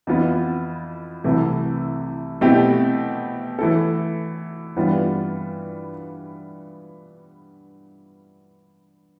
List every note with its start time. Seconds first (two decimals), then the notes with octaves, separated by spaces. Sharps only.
0.07 F2 E3 B3 F4
1.24 C2 C3 E3 A3 E4
2.41 B2 A3 C4 E4 G4
3.59 E3 A3 E4 A4
4.76 G2 E3 G3 B3 F4